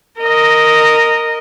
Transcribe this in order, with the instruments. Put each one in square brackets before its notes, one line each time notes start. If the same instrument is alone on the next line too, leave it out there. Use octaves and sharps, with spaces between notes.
[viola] A#4 D#5